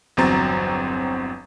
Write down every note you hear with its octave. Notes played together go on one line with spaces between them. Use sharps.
G1 E2 F#3 C4 A#5 A6